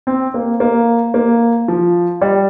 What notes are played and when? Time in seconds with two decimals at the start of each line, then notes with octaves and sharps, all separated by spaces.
0.07 C4
0.34 A#3
0.60 A#3
1.14 A#3
1.68 F3
2.21 G3